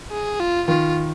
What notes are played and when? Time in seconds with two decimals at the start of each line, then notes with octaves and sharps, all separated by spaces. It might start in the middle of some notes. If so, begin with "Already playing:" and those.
0.11 G#4
0.40 F4
0.68 D#3 F4